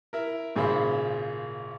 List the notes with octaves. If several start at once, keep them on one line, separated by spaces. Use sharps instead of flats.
E4 A#4
G#1 A#2 C#3 G#4 C5 B5